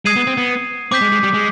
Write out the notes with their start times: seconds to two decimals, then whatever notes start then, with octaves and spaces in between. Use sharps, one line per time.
0.05 G#3 D#6 G#6 C7 D#7
0.16 B3
0.27 C4
0.37 B3
0.91 C4 D6 G6 B6
1.02 G#3
1.12 G#3
1.23 G3
1.34 G#3